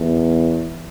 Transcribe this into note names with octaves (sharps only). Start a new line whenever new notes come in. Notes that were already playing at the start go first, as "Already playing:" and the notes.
Already playing: E2